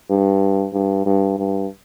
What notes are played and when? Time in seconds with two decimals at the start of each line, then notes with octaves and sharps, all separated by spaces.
0.10 G2
0.73 G2
1.06 G2
1.38 G2